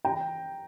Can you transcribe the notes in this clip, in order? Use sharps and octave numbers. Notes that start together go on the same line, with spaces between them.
G5 A#5